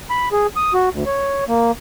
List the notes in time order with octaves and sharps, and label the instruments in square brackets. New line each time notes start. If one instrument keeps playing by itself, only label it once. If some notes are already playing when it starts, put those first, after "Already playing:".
[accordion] B5
G#4
D#6
F#4
D2
C#5
A#3